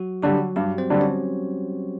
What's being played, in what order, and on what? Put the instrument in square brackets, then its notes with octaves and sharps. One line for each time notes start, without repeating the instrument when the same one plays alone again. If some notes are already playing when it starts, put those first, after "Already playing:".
Already playing: [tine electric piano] F#3 F#4
[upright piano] D3 G3 [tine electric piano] F#3 F#4
[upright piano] G2 [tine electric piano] G3 G4
[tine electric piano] C4 C5
[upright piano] D3 G3
[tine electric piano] C#4 C#5